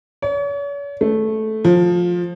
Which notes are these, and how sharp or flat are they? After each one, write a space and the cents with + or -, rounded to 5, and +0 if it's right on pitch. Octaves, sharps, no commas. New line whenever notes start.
C#5 +40
A3 -10
F3 +15